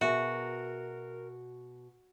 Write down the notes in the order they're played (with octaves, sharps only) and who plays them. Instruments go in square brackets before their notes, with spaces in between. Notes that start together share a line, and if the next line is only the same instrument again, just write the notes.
[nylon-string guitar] B2 G#4 [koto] F#4 [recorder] A#4 [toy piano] E5